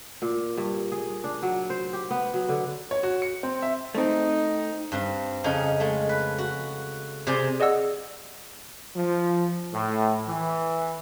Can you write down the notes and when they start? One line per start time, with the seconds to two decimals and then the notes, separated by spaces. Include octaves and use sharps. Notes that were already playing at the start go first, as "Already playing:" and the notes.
0.22 A#2
0.57 G2
0.92 G#4
1.24 D4
1.43 F#3
1.70 C5
1.93 G4
2.11 B3
2.34 F#3
2.49 D3
2.91 C#5
3.03 F#4
3.22 C#7
3.43 C4
3.62 E5
3.95 A3 C4 D#4
4.92 G2 C4
5.44 F2 C#3 D#4 G#5
5.80 G#3 A3
6.09 B4
6.38 F#4
7.27 C3 G#4 C5 D5 G#5 C6
7.60 G#4 D5 D#5 F#5 E6
8.96 F3
9.73 A2
10.27 E3